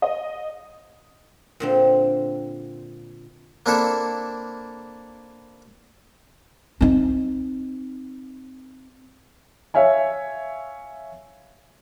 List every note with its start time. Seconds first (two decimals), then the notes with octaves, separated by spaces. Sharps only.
0.02 D#5
1.60 A#2 D3 C4
3.66 A#3 C4 D4 E4 A4
6.81 C4 D#4
9.74 C#5 E5 F5 G#5